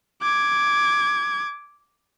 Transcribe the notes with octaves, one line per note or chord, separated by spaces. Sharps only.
D6 G#6